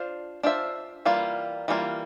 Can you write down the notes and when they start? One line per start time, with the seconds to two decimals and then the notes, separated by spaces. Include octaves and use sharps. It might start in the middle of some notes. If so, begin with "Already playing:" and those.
Already playing: D4 F4 C5
0.43 D4 F4 C5 E5
1.05 E3 G3 A#3 F4
1.68 E3 G3 A#3 F4